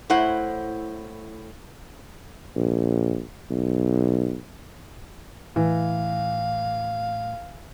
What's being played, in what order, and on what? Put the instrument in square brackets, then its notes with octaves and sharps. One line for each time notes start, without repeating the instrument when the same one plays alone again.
[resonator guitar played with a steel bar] A2 E4 C5 F#5
[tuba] A#1
B1
[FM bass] A2 [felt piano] E3 [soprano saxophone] F5